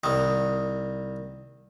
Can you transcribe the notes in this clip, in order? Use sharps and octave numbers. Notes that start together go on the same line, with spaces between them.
C2 D#3